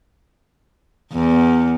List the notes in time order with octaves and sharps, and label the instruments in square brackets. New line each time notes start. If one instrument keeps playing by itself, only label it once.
[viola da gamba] E2